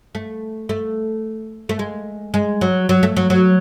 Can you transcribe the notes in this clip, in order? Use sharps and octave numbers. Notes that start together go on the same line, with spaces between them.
A3
A3
A3
G#3
G#3
F#3
F#3
A3
F#3
F#3